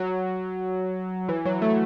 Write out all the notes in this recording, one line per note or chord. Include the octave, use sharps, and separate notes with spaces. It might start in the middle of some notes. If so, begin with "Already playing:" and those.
Already playing: F#3
E3
F#3
A3